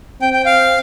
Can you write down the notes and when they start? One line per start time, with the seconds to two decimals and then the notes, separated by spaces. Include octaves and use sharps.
0.21 C4 G5
0.33 G5
0.45 F5